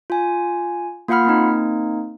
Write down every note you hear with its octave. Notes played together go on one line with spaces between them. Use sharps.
F4 G#5
A#3 F4 F5 F#5 B5 F6
A#3 C4 D#4